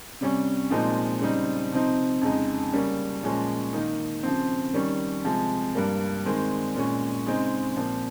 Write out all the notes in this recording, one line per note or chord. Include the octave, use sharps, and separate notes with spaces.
C3 G3 C#4
A#2 F3 G#3 C4 D#4
C#3 G3 C4 D#4
C3 F3 C4 D#4
F2 C#3 G#3 D#4
C#3 G3 A#3 C#4
A#2 F3 G#3 C#4
D#3 A#3 D#4
C#3 F3 C4
D#3 G3 C#4
C3 F3 G#3
G2 G3 A#3
D#3 G#3 C4
A#2 G#3 C#4
C#3 G#3 C4 D#4
A#2 F3 C4